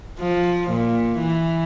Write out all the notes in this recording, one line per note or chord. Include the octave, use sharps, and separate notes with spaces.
F3
A#2
E3